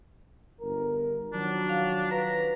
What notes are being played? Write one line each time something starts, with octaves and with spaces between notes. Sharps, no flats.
G1 A#4
D#3 F3 F#3 D4
F5
B4 A#5